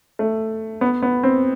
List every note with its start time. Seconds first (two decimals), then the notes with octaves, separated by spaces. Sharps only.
0.19 A3
0.81 B3
1.02 B3
1.23 C4